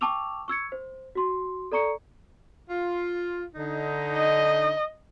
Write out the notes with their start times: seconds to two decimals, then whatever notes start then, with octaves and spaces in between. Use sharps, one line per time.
0.01 G5 A5 C#6 D6 E6 F7
0.48 C#6 E6 G#6 C#7
0.72 C5
1.15 F#4 C6
1.72 A4 D5 A#5 C#6 C#7
2.69 F4
3.55 D3 D#4
4.16 D#5